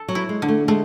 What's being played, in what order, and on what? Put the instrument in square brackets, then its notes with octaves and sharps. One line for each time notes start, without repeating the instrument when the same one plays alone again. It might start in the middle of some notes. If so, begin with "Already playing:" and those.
Already playing: [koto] A4
[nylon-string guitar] F#3
[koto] E4
[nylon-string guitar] G#3
[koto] D3
[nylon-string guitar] A3
[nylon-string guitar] G#3 [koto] A3